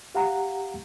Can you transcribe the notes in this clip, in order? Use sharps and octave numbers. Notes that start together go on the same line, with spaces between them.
G4 F5 F#5 A#5